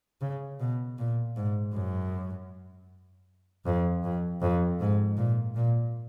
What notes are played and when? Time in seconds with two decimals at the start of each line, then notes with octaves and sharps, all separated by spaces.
0.21 C#3
0.60 B2
0.99 A#2
1.36 G#2
1.74 F#2
3.66 F2
4.04 F2
4.42 F2
4.80 G#2
5.17 A#2
5.55 A#2